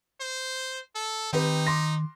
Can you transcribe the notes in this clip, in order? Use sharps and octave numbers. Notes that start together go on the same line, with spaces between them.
C5
A4
D#3 C4 D#4 G4 B4
C6 D6 A#6